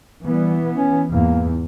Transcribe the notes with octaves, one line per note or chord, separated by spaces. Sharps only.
E3 G3 B3
C#4
E2 G#2 A#3